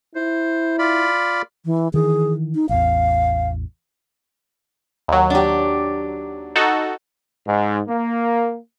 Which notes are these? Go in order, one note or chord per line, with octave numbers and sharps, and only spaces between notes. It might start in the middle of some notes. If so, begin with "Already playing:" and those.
E4 C5
F4 D5 B5
E3
D#3 E3 G#4
D#4
A1 E2 F5
D#2 F#3
D4 G4
D#4 F#4 A4
G#2
A#3